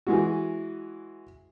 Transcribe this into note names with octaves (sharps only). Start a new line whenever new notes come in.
E3 G#3 F#4